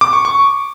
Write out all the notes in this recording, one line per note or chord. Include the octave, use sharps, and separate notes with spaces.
D6
C#6
C#6